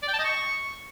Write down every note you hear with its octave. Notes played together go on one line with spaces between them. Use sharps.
D5
G5
A5
D#5
C#6